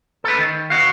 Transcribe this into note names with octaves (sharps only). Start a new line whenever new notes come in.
A4 B4
D#3
F#4 F5